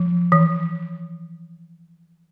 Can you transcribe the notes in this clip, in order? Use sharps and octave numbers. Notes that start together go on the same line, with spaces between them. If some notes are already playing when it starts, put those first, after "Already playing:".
Already playing: F3
E3